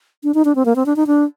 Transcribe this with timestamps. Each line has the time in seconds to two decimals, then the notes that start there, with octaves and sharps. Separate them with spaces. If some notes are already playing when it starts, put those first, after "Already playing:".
0.23 D4
0.34 D#4
0.45 D4
0.55 C4
0.65 A#3
0.76 C4
0.86 D4
0.96 D#4
1.07 D4